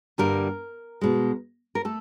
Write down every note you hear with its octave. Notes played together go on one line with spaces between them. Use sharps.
G2 D3 G3 A#3 A#4
B2 G#3
A#4
A3 A4